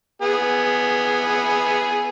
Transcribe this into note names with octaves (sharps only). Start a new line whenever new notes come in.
B3 G#4